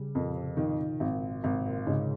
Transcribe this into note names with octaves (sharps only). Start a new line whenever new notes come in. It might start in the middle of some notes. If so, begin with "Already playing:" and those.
Already playing: C#3 G3
F2 A#2
C3
A#2 D#3
G#1
G#1 C3
A#2
G#2 C#3